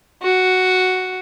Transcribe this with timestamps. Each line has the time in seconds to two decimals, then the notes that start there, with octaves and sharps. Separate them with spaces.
0.23 F#4